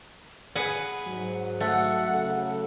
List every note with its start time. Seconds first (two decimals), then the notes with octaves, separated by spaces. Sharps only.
0.55 G#4 B4 F#5
1.07 G#2 F#3
1.60 A3 F#5
2.11 C#3 A4